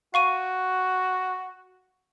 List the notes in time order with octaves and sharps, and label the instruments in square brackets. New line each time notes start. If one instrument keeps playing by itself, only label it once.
[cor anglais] F#4 [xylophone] F5 C#6 D#7